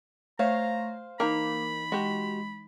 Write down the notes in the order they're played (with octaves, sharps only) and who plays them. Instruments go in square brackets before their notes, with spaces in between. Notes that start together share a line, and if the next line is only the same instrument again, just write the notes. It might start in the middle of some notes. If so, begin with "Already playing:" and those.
[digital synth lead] A3 [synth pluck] C5 F5 [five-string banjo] C#5 [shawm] A#5
[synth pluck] E3 D#4 [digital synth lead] A#3 [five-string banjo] A#4 A#5 [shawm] B5
[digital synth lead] G#3 [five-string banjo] F#4 G4